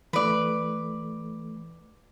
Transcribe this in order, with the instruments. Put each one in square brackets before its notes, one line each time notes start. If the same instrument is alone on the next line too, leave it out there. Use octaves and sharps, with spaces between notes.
[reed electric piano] E3 A3 [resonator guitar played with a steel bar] B4 D5